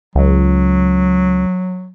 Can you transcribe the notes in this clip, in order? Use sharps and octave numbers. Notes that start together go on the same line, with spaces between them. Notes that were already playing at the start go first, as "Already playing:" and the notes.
C#2 F#3